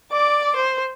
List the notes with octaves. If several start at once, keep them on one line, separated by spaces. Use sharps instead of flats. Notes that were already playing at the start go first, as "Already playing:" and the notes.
D5 D6
C5